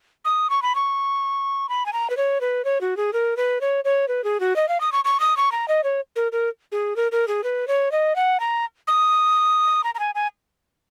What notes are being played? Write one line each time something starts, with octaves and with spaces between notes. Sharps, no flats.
D#6
C#6
B5
C#6
B5
G#5
A#5
B4
C#5
B4
C#5
F#4
G#4
A#4
B4
C#5
C#5
B4
G#4
F#4
D#5
F5
D#6
C#6
C#6
D#6
C#6
A#5
D#5
C#5
A#4
A#4
G#4
A#4
A#4
G#4
B4
C#5
D#5
F#5
A#5
D#6
A#5
A#5
G#5
G#5